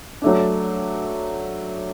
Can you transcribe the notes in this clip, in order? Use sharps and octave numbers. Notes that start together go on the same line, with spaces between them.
F#3 A3 D4